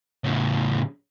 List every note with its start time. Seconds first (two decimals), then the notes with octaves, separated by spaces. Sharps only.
0.24 A2 C#3